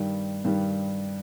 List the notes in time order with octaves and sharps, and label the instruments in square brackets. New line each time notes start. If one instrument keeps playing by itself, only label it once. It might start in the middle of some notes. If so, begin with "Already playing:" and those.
Already playing: [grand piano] G2 D#3 G3
G2 D#3 G3